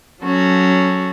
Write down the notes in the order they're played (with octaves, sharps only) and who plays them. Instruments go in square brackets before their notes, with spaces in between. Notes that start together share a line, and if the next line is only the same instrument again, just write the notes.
[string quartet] F#3 C#4 F#4 A4